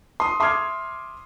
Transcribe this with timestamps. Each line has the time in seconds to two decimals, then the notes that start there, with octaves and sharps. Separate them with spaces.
0.20 C6 D#6
0.40 E5 C6 D6 D#6 F6 G#6